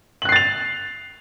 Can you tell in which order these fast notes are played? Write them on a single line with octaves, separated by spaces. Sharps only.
F#7 F#6 C7 A6 F7